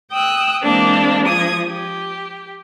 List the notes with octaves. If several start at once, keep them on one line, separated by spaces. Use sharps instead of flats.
G5 D#6 E6 F#6
E3 G#3 A#3 C4 D4
F3 D#6 G#6
G4